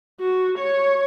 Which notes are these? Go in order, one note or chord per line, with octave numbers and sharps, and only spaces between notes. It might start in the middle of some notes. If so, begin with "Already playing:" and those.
F#4
C#5